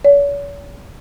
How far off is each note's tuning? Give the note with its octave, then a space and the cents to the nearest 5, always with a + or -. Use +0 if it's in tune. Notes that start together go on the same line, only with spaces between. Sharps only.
C#5 +45